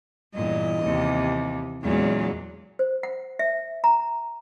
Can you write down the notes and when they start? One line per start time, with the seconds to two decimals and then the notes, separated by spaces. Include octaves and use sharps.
0.34 E2 G2 A#2 D#5
0.82 D#2 C3
1.83 E2 A#2 C#3 F#3 G#3
2.79 C5
3.03 F#5
3.39 E5
3.84 A#5